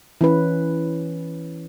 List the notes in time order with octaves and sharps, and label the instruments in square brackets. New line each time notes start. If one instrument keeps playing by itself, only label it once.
[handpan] E3 C#4 B4